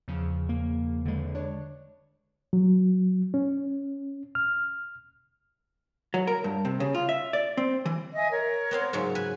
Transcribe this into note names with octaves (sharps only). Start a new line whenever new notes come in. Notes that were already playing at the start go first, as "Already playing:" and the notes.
E2 C#3 F3
A#3
D3 G#3
D4 C#5
F#3
C#4
F6
F#3
A#4
G2
C3
C#3
F4
E5
D5
C4
E3
D#5 E5 G#5
A#4 C#5
B3 C4 F5
G#2 C#3 F#3
B4 G#5